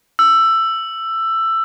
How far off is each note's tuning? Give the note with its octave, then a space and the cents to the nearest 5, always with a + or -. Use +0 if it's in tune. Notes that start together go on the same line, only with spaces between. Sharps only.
E6 +10